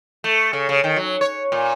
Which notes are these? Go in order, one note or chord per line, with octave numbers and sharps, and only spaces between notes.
A3
C#3
C#3
D#3
F#3
C#5
A#2